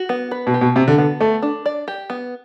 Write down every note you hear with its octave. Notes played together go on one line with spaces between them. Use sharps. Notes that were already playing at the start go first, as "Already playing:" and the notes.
Already playing: F#4
B3
B4
B2
G4
B2
C3 F#4
D3
D3 B3
A3 A4
D4
D5
G4
B3